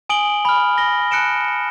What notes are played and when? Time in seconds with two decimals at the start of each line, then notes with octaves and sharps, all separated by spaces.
0.09 G#5 D#6 D7 F#7 G7
0.45 B5 F6
0.78 A#6 G7
1.11 A5 F#6 C#7 D7 E7